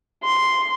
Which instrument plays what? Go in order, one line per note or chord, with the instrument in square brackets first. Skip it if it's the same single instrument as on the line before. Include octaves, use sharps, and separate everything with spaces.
[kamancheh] C6